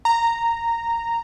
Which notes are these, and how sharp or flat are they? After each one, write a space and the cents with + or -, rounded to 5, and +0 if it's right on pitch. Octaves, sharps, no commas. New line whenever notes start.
A#5 -10